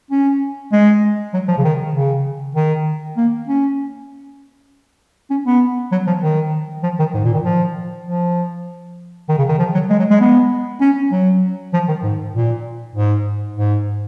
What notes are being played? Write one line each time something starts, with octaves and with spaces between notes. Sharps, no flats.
C#4
G#3
F#3
F3
C#3
D#3
C#3
D#3
A#3
C#4
C#4
B3
F#3
F3
D#3
F3
D#3
G#2
A#2
D#3
F3
F3
D#3
C#3
D#3
F3
F#3
G#3
F#3
G#3
B3
C#4
F#3
F3
D#3
G#2
A#2
G#2
G#2